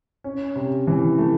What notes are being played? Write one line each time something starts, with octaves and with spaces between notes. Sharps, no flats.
C#4
C3
E3
A3